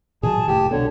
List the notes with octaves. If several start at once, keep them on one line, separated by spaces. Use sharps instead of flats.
A#2 D#3 F#3 G#4 A5
F1 A2 G4
C2 B2 D3 C#5